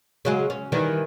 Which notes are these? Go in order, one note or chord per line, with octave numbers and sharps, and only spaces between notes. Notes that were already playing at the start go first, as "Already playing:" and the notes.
C#3 F#3 G#3
C#4
D#3 E3 G3